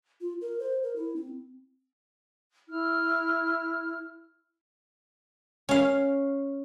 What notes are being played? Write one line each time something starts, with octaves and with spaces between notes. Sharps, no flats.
F4
A#4
C5
A#4
E4
C4
E4 F6
C#4 F5